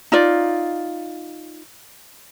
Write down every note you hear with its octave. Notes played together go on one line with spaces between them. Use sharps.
D#4 F4 D5